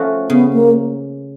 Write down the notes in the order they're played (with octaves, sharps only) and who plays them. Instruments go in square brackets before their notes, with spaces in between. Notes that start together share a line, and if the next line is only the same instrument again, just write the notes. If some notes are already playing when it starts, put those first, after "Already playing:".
Already playing: [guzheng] F3 A3 C#4 F#4
[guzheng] C#3 [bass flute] B3
[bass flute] A#3